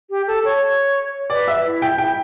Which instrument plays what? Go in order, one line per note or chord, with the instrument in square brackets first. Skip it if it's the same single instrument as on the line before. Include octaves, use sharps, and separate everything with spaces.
[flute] G4
A4
C#5
[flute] B4 [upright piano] D5
[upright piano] E5
[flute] E4
[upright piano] G5
[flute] E4 [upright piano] G5